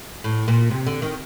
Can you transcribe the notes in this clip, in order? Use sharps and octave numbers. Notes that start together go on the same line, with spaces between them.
A2
A#2
C3
D3
D#3